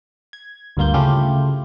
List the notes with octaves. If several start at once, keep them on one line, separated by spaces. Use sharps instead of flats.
G#6
D2 G2 A#3 F4 G6
C#3 A3 E4 F4 G4